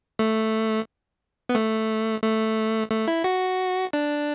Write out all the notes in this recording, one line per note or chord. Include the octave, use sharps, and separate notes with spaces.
A3
B3
A3
A3
A3
E4
F#4
D4